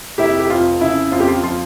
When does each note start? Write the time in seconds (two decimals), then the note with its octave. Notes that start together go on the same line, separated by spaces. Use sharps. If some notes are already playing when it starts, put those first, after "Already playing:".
0.18 F1 E4 G4
0.40 G4
0.49 F2 F4
0.81 C#3 E4
1.12 F2 F4
1.20 G4
1.28 F4
1.43 F3 F4